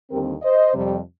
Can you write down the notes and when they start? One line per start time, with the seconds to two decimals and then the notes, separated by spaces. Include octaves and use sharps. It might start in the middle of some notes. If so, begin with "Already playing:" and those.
0.11 D#2 D3 G3 C4 G4 A#4
0.43 C5 D#5
0.74 F2 C3 G3